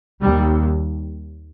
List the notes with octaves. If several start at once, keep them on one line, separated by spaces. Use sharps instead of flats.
D#2 G3